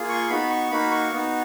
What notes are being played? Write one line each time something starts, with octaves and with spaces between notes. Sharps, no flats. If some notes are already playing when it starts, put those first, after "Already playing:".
Already playing: A#3 F4 G#4
C#6
B3 D#4 F#4 B5
C#6
A#3 D#4 F#4 B5
C#6
B3 D#4 F#4